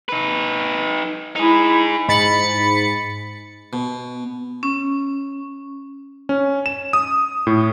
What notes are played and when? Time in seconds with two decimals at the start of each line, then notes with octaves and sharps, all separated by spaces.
0.09 D#4 B4
1.36 D#4 E4 G#4
2.08 G#2 B5 A6 C#7
3.73 B2
4.63 C#4
6.29 C#4
6.66 E7
6.93 D#6
7.47 A2